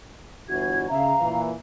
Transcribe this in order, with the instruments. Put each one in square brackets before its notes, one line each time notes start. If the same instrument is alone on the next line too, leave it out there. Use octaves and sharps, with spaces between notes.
[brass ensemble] G1 E3 F#4 [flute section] G#6
[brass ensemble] C#3 E5 [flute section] F5 A#5
[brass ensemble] A#2 E3